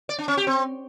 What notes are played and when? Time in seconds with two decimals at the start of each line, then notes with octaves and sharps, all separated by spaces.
0.09 D5
0.19 D4
0.28 C#4
0.37 G4
0.47 C4